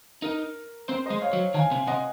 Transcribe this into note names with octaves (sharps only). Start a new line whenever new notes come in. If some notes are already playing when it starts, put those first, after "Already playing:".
D#4 A#4
C4 C5
C5 D#5
G#3
C#5 F5
F#3
D#3 F5 G#5
C3
C3 D#5 F#5